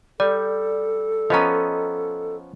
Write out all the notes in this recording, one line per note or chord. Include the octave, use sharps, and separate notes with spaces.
G3 A4 D5
F3 B3 C#4 D#5 A#5